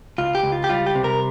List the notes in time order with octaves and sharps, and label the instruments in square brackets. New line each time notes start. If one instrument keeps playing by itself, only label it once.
[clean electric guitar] C#2 F4
G4
C#2
F4
G4
G3 F4
G4
C3
A#4